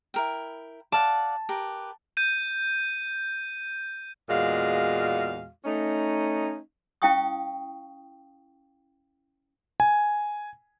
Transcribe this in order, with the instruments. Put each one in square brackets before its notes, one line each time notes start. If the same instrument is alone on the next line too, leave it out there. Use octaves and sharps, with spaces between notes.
[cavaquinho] E4 A#4 G5
[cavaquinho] D5 F5 F#5 [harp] A5
[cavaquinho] G4 A#4 B4
[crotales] G6 D#7
[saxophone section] E2 A#2 G#3 F#4 F5
A3 C#4 D#4
[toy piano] C#4 E4 F5 G5 C#6 D#6
[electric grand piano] G#5